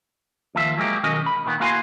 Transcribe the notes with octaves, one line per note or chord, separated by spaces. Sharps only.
D#2 F3 E5
F#3 G#3 A#3 G4
B1 D#3 C#4 F#4 A#4 D#5
B5
A#2 D#3 B3
A#3 E4 F#4 F5 G#5 C6